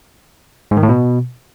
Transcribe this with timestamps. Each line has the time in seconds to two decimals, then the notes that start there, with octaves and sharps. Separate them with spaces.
0.71 G#2
0.77 D#3
0.83 A2
0.89 B2